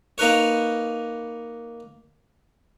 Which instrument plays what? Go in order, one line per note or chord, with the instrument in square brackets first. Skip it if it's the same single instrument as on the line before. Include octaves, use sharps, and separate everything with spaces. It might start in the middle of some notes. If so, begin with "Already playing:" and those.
[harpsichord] A#3 D#4 A#4 B4 C#5